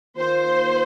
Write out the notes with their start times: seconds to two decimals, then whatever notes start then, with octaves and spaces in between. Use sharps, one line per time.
0.16 D#3 A#3 F4 C5